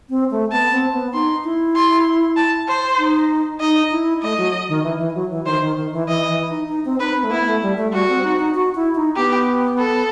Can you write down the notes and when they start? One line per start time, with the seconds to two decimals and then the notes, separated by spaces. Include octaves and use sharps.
0.10 C4
0.31 A3
0.52 B3 A5
0.72 C4
0.93 B3
1.13 D#4 C6
1.44 E4
1.76 C6
2.36 A5
2.68 C5
2.99 D#4
3.60 D#4 D#5
3.91 E4
4.22 A3 D#5
4.38 F#3
4.69 D#3
4.83 E3
4.99 E3
5.15 F#3
5.30 E3
5.45 D#3 C5
5.61 D#3
5.76 D#3
5.93 E3
6.07 E3 D#5
6.28 E3
6.49 D#4
6.69 D#4
6.85 C4
7.00 D#4 B4
7.16 C4
7.23 A3
7.31 B3 E4
7.46 A3
7.62 G3
7.77 A3
7.93 G3 F#4
8.08 C4
8.23 D#4
8.39 D#4
8.55 F#4
8.75 E4
8.96 D#4
9.16 B3 G4
9.78 A4